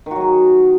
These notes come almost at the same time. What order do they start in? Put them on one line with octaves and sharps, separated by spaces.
D#3 F#4 F#3 G#4